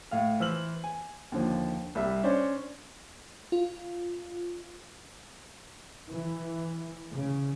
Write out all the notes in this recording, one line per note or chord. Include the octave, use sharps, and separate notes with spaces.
A2 F5
E3 C5 E6 F6 F#7
G#5
D#2 D3 F3
C2 G3 E5
C#4 D4 C5 C#5
F4
E3
C#3